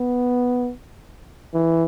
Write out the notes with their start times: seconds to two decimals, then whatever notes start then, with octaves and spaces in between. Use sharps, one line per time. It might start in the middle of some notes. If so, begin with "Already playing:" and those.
Already playing: B3
1.54 E3